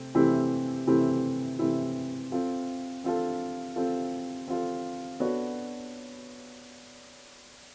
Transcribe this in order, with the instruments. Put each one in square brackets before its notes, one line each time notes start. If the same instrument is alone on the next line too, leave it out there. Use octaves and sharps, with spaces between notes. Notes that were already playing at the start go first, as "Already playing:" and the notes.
Already playing: [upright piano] C3 A3 C4
C3 E3 A3 C4 E4
C3 E3 A3 C4 E4
C3 E3 A3 C4 E4
C4 F4 A4
C4 F4 A4
C4 F4 A4
C4 F4 A4
B3 D4 F#4 A4 C#5